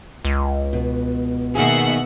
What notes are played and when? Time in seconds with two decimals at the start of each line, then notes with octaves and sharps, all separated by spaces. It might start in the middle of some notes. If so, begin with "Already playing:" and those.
0.25 C#2
0.73 B2
1.55 B2 D#3 A#3 G#4 E5 F#5